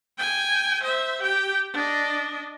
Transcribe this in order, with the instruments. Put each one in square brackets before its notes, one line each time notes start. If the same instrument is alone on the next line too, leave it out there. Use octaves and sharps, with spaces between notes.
[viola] G5 G#5
C5 E5
G4 G5
D4 D#5